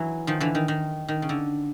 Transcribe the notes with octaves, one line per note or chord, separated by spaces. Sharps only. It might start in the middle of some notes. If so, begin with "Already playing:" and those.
Already playing: E3 F#3
D#3 F3
D3 E3
D#3
D#3
D#3
C#3
D3